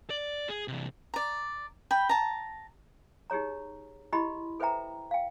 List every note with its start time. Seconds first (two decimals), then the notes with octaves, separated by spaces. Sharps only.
0.10 D5
0.49 G#4
0.68 C3 E3
1.14 D5 A#5
1.91 G5 B5
2.09 A5 A#5
3.30 D#4 G4 G#4 C#5 A#5
4.12 E4 G4 D#5 B5 C6
4.60 A4 B4 C5 E5 G5 A#5
5.11 F5 G5